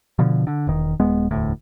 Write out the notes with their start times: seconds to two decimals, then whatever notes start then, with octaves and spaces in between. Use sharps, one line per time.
0.19 B2 D3 F3
0.47 D3
0.67 E1 D#3
1.00 D#1 G#3 B3
1.31 E1 D2 A2